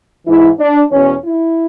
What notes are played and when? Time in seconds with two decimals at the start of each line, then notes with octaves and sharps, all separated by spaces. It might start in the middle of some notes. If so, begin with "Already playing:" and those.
0.27 G#2 E3 E4
0.59 D4
0.91 E2 B2 C#4
1.24 E4